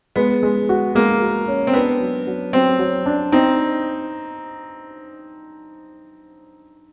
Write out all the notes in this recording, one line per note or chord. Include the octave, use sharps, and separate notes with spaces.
G#3 B3
G#3
F#4
G#3 A#3
F#4
C#4
C4
B3 D4
F#3
F#3
F#3 C4
F#3
D4
C4 D#4